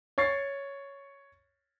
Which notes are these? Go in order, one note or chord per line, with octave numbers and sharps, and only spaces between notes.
C#5 C#6 A6 C7